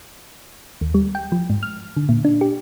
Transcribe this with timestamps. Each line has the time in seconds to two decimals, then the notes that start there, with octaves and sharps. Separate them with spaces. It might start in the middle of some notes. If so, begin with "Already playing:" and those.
0.81 D#2
0.94 G3
1.15 G5
1.32 F3
1.50 G#2
1.63 F6
1.97 D3
2.09 A#2
2.25 D4
2.41 G4